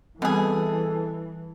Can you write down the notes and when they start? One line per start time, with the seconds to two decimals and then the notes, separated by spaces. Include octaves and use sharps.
0.22 B2 E3 G3 B3 C4 G#4 A4